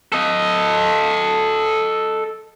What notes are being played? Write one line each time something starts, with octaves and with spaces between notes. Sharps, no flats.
A4 D#5